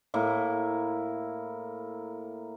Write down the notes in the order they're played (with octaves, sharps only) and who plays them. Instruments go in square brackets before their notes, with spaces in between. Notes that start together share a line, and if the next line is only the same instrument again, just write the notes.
[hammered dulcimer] A2 A#3 E4